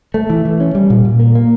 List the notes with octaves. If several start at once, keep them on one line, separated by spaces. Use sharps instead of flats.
A3
E3
E3
C#4
G3
A#2
A#2
A#3
A#3